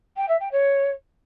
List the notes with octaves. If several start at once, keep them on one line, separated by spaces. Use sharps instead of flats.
G5
E5
G5
C#5